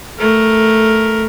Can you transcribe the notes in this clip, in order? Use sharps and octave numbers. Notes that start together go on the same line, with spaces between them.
A3 A#4